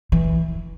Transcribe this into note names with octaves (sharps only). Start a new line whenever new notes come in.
E3